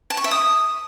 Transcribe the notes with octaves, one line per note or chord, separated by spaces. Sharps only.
A5
C#6
E5
D#6